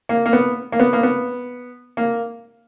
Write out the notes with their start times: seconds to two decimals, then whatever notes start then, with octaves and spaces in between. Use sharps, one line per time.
0.09 A#3
0.26 A#3
0.33 B3
0.72 A#3
0.80 B3
0.93 A#3
1.03 B3
1.97 A#3